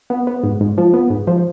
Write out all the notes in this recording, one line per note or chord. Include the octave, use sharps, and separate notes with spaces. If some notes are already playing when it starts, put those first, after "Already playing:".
B3
B3
G#2
G#2
F3
B3
G#2
F3